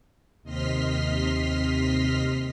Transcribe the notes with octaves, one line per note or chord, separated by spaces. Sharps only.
D#2 C3 D#5 C6 F6 B6